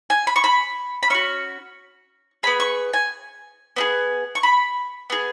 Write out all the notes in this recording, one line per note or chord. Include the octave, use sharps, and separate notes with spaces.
G#5
B5
C#6
B5
B5
C#4 F#4 C#6
B3 G#4 B5
C#6
G#5
B3 E4 G#4
C#6
B5
B3 G#4